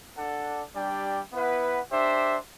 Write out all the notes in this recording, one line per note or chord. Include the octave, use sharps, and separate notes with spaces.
D4 A4 D5 F#5
G3 D4 G4 D5 G5
B3 E4 B4 F#5
D4 G4 C5 E5